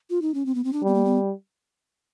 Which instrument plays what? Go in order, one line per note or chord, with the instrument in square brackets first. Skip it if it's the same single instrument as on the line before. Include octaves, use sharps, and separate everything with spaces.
[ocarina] F4
D#4
C#4
C4
B3
C4
D4
[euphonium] G3 [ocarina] B3
[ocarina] A#3
B3